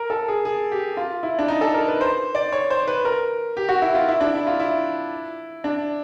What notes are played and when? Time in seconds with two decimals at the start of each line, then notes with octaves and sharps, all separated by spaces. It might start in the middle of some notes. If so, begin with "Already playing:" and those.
Already playing: A#4
0.10 A4
0.28 G#4
0.45 G#4
0.72 G4
0.97 F4
1.23 E4
1.39 D4
1.48 D#4
1.61 A4
1.74 A#4
1.88 B4
2.01 C5
2.35 D5
2.52 C#5
2.70 C5
2.88 B4
3.05 A#4
3.57 G4
3.69 F#4
3.82 E4
3.95 F4
4.08 E4
4.21 D4
4.35 E4
4.47 F4
4.60 E4
5.64 D4